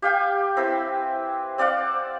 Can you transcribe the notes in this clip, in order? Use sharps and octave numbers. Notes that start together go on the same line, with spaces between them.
G4 F5 G5 G#5
C4 E4 B4
C4 D5 F5 F#5